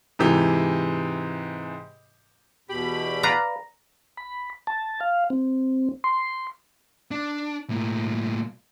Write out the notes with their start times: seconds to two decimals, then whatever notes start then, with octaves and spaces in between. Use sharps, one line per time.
0.19 G#2 C3 E3 G4
2.69 E2 B2 G4 B5
3.23 B4 D5 F5 A#5
4.17 B5
4.67 A5
5.01 F5
5.30 C4
6.04 C6
7.11 D4
7.70 A2 A#3